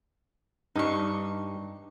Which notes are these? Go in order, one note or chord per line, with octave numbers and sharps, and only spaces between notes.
G2 G3 D4 D#4 C#6